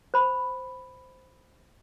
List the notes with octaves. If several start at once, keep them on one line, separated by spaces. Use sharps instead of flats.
C5 B5